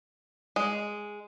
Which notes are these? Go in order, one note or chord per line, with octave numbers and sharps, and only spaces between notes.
G#3